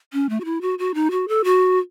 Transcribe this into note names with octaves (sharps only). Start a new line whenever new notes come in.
C#4
A3
F#4
E4
F#4
F#4
D#4
F#4
A4
F#4